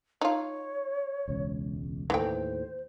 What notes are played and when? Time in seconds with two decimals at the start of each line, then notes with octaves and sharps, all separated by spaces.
0.21 D#4 F4 C#5
1.28 E1 C#2
2.10 D#2 A2 E3 A3 C5 G5